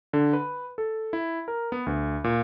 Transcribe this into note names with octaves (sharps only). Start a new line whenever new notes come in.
D3
B4
A4
E4
A#4
B3
D2
A#2